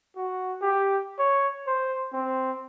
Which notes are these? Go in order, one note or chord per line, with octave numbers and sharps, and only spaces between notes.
F#4
G4
C#5
C5
C4